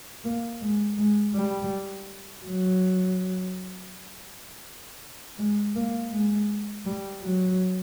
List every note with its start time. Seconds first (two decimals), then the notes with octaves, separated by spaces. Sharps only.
0.24 A#3
0.61 G#3
0.98 G#3
1.35 G3
2.44 F#3
5.39 G#3
5.76 A#3
6.12 G#3
6.86 G3
7.22 F#3